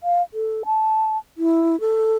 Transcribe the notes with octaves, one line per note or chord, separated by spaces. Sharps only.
F5
A4
A5
E4
A4